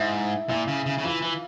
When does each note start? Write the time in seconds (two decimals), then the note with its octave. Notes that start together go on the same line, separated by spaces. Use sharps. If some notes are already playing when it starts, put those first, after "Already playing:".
Already playing: G#2 E4 E5
0.49 A#2 E4 E5
0.68 C#3
0.86 C#3
0.98 C#3
1.04 E3 F4 F5
1.22 E3